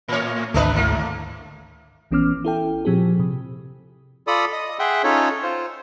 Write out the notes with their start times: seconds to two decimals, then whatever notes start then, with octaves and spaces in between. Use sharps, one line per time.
0.08 A2 C#5
0.54 G#1 D2 A3 D4 B4
0.74 G#2 A#3
2.11 A#1 E3 B3 C#4 D6 F6
2.45 E4 A4 G5
2.85 A#2 F3 C4 G4 G#4
3.20 C3
4.27 F4 A4 D5 B5 D#6
4.53 D#5 D#6
4.79 G#4 E5 F#5 G5 C6
5.04 C#4 D#4 F4 A4 C#5
5.43 F4 C5